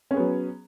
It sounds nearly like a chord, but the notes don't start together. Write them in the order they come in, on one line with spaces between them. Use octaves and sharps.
C#4 G#4 B3 F#3